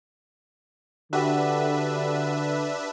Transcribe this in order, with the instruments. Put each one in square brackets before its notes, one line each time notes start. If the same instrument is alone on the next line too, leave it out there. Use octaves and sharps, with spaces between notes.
[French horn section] D3 [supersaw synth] D4 B4 E5 [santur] F#4 G4